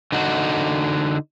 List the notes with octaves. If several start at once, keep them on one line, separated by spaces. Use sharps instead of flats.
D3 D#4 F#4